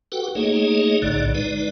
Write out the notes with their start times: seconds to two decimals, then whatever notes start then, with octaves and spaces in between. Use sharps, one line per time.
0.12 F#4 G4 A4 B4 F#5 G5
0.35 A3 A#3 D#4 G#4 C#5 D#5
1.02 B1 A2 D3 D#4 D5
1.35 G#3 D#4 B4 D5